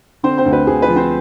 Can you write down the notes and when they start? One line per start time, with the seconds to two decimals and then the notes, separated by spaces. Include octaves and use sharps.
0.23 D3 C4 C5
0.38 C4 C5
0.46 D2
0.53 B4
0.67 D2 G#4
0.82 B4
0.88 F3
0.96 C4 C5